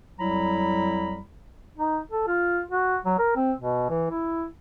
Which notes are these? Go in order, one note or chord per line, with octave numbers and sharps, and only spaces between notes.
F2 F#3 G3 E4 A#5 B5
D#4
A4
F4
F#4
F#3
A#4
C4
B2
E3
E4